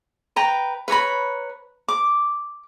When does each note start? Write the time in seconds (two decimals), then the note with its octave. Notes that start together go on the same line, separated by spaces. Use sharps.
0.36 B4 G5 A#5
0.88 B4 C#5 A#5 B5
1.88 D6